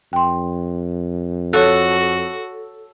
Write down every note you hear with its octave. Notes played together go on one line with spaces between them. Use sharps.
F2 G5 C6
F#4 A4 C#5 F#6